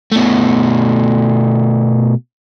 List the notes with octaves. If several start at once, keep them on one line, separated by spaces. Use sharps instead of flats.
B2 A3